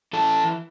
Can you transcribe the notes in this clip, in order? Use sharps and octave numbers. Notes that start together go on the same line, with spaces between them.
E3 A4